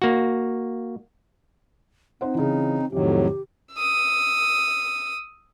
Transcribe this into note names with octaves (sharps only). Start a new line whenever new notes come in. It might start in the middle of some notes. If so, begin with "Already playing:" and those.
A#3 F#4
C4 D#4 C5 F#5
C#3 E3 D#4
F2 A2 C3 D#3 F#3 G4
D#6 E6